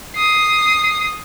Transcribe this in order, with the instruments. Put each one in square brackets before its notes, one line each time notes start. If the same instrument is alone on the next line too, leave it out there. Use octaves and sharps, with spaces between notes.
[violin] D#6 C7